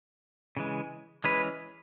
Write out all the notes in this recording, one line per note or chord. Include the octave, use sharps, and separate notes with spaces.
C#3 E3 G#3
E3 G#3 C#4 G#4 B4